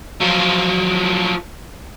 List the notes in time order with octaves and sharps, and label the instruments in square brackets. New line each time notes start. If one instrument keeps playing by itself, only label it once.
[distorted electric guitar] F3 F#3